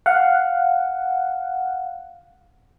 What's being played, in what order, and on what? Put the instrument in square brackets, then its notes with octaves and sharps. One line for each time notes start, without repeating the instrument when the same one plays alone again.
[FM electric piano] F5 F#5